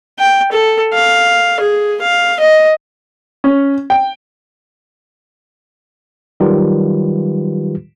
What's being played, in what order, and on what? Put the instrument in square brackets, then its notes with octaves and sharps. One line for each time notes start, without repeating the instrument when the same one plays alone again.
[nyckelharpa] G5
A4
F5
G#4
F5
D#5
[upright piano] C#4
G5
[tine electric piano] D#3 F#3 G3 F4 G4 B4